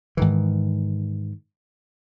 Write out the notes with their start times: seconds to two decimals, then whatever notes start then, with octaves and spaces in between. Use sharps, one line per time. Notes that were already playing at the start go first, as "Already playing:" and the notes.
0.17 G#2 D#3 E3